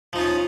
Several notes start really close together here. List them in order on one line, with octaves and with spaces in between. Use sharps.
F3 D#4 F4 C#4